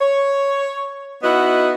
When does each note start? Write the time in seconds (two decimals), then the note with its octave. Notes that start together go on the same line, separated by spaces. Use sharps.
0.01 C#5
1.23 B3 D#4 E4 F#4 D#5